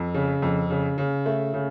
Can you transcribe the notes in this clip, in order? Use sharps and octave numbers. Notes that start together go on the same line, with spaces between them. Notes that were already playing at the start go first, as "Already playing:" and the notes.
Already playing: F2
C#3
F2
C#3
C#3
A3
C#3